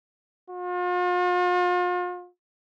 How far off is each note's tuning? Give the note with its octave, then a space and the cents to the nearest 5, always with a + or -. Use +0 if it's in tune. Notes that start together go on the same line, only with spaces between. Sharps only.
F4 +40